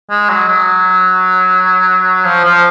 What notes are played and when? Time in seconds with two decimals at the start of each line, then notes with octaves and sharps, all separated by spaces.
0.10 G#3
0.29 F#3
0.49 F#3
2.25 F3
2.45 F3